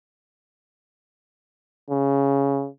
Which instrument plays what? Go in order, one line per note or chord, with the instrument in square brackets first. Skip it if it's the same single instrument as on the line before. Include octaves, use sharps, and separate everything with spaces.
[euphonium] C#3